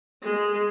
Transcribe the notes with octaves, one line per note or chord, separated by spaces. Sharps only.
G#3